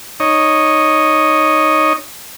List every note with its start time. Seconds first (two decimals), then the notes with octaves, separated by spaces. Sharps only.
0.20 D#4 C#5 D#5